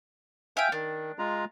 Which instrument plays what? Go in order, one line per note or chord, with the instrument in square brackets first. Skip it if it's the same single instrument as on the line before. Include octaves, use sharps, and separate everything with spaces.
[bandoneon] E5 G#5 [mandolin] F5 G5
[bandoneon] D#3 [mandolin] D4
[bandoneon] G#3 F4 A#5